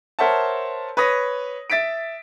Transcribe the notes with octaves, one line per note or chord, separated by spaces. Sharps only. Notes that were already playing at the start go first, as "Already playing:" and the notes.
A#4 C5 C#5 E5 F#5 A5
B4 C#5 D#6 A#6
E5 A6 B6 D7